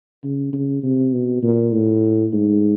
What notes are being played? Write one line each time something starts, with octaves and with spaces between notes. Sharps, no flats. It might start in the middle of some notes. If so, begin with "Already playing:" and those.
C#3
C#3
C3
B2
A#2
A2
G#2